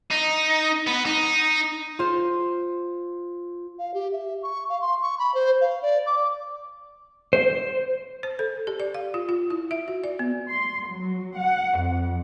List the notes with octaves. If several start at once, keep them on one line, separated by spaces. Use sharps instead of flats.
D#4
B3
D#4
F4 C5
F5
G4
E5
C#6
F5
C6
C#6
B5
C5
F5
D5
D6
C5
C5
A4
G4
D5
F5
F4
F4
E4
E5
F#4
D5
B3
C6
F#3
F#5
F2